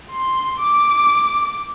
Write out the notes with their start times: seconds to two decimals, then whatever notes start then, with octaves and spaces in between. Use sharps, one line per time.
0.11 C6
0.60 D6